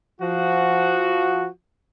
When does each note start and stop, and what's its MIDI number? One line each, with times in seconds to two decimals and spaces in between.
0.21 1.48 53
0.21 1.48 66